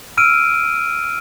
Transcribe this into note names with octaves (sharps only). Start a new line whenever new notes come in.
E6 F6 D7 D#7